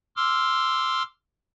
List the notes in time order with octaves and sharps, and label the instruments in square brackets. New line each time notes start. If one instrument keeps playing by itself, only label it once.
[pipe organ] C6 D6 E6 F6